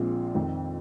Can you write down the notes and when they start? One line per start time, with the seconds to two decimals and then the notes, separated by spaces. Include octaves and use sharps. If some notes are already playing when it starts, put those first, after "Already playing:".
Already playing: A#1 A#2 F3 G#3 C4
0.35 F2 D#3 C4